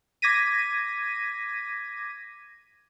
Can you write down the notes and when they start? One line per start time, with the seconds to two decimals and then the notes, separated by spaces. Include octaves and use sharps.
0.22 D6 G#6 A#6 B6 D#7